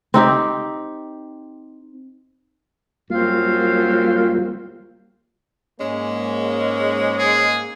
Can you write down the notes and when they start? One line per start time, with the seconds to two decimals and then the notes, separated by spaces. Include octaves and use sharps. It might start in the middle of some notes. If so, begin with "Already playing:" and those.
0.14 C4 D#4 G4
3.10 F#2 G3 A#3 C4 F4 F5
5.80 G#2 G#3 A#3 C#4
7.19 G#4